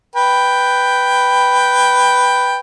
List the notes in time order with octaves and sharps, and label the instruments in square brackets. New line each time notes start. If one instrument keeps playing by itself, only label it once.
[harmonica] B4 G5